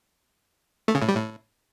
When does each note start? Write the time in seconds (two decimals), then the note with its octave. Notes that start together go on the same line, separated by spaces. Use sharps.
0.88 A3
0.95 C#3
1.02 A2
1.08 G3
1.15 A2